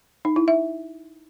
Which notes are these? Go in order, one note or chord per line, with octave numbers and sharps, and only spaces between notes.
D#4
E4
E5